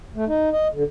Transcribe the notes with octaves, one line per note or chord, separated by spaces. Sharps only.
A3
D#4
D#5
D3